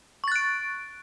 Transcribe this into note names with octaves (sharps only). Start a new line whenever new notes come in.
C#6 F#6 A6 D7